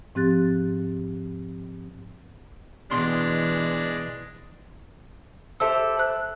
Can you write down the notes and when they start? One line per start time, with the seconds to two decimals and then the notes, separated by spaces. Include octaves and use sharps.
0.15 G#2 F3 C4 G4 F#6 A6
2.91 B2 E3 G#3 D4 C6
5.60 G4 A4 C5 E5 A5 E6
5.99 F#6